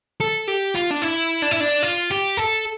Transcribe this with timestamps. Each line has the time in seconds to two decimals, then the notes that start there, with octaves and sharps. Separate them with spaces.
0.20 A4
0.48 G4
0.75 F4
0.91 D4
1.02 E4
1.42 D4
1.51 E4
1.60 D4
1.83 F4
2.11 G4
2.37 A4